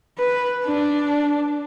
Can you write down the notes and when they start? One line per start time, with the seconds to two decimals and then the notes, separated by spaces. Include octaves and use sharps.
0.18 B4
0.65 D4